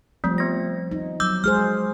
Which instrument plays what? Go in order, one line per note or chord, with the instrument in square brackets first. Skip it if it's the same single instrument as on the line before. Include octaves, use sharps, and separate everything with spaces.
[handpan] F3 G3 C4 [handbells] A3
[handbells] B3 A#6
[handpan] D#4
[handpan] F#3 [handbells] D6 E6 G6
[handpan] G#3 G#4 C5 [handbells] F6